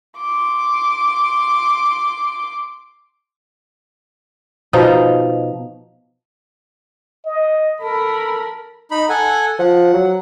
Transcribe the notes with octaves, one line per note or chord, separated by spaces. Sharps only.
C6 D6
B2 F3 D#4
D#5
A4 A#4 B5
D#4 B5
A4 F#5 G#5
F3 F#5
F#3